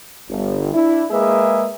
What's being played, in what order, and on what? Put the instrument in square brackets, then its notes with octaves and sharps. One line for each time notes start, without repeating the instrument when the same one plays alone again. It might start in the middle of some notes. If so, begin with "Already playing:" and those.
[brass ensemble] G1
D4 E4
G#3 A#3 G#4 B4 E5